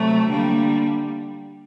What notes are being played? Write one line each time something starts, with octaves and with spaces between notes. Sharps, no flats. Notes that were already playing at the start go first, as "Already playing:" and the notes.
Already playing: C3 F#3 A3
D3 G3 A#3